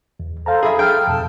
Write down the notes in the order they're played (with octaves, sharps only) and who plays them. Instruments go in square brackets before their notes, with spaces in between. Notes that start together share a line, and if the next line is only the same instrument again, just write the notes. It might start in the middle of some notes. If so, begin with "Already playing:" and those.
[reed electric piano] E2
[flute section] A4 [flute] C5 [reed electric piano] F5 A5 A#5
[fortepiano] G#4 E5 [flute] B5
[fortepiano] G5 [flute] F6
[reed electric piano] F2 B2 [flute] A5